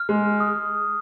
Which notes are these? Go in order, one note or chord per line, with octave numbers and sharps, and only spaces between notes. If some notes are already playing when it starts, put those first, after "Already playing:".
Already playing: F6
G#3
D#6